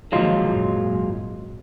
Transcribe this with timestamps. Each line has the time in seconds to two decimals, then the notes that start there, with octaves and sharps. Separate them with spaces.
0.12 D#3 F3 F#3 G#3 A#3 F4
0.47 G#1 F#2 A#2